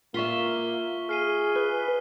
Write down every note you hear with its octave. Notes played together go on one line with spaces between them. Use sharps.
A#3 F4 E5 C#6 B6 G7
G#4 F6 C7 D#7
B4 F#6